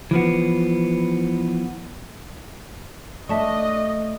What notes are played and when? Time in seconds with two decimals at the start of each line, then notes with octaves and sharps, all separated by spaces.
0.11 E3 F3 B3
3.29 A3 D4 D#5 E5 A5 C#6